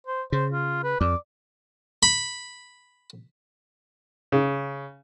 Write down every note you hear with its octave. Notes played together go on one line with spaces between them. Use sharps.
C5
C#3 C5
F4
B4
F2 D5
B5
C#3